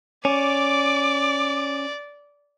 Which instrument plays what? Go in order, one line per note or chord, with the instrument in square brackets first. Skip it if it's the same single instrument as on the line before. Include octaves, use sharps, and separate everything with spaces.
[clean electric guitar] C#4 [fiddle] D5 [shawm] D6